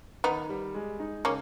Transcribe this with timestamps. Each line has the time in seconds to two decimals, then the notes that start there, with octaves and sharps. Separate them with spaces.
0.24 D#3 B3 D#4
0.49 G3
0.75 G#3
1.00 D#4
1.25 C#3 A#3 C#4